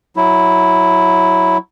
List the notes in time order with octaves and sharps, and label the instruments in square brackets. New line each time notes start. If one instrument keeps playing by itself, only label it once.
[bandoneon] F#3 E4